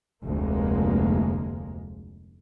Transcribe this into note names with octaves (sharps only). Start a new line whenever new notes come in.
F1 D2 G#3 A#3